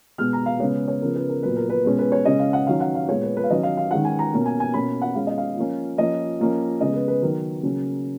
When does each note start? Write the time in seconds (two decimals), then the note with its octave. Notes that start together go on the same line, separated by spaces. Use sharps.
0.18 B2 G#3 B3 F6
0.33 A#5
0.46 F5
0.60 C#3 G#3 B3 C#5
0.88 C#5
1.02 C#3 F3 B3 A#4
1.16 B4
1.29 A#4
1.43 A#2 F#3 B3 B4
1.56 A#4
1.70 B4
1.84 B2 G#3 C#4
1.99 B4
2.12 C#5
2.25 C#3 G#3 C#4 D#5
2.39 F5
2.53 F#5
2.67 D#3 F#3 C#4 F5
2.80 F#5
2.95 F5
3.08 A#2 G#3 B3 C#5
3.23 B4
3.37 B4
3.44 F5
3.50 D#3 F#3 C#4 D#5
3.63 F5
3.77 F5
3.91 D#3 G#3 C#4 F#5
4.05 G#5
4.19 A#5
4.33 B2 A#3 C#4
4.46 G#5
4.60 G#5
4.74 B2 A#3 C#4 B5
5.02 F#5
5.15 B2 G#3 C#4 F5
5.27 D#5
5.38 F5
5.56 F3 A#3 C#4
5.98 F3 A#3 C#4 D#5
6.39 F3 A#3 C#4
6.81 C#3 G#3 B3 D#5
6.94 B4
7.08 B4
7.22 D#3 F#3 B3 A#4
7.63 C#3 F#3 A#3 C#4